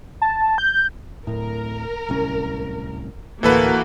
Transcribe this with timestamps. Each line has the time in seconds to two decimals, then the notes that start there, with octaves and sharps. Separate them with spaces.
0.22 A5
0.58 G6
0.75 G6
1.27 D1 A2 A#4
2.09 D1 C2 C#4
3.43 D2 A2 E3 A#3 F#4 A4 B4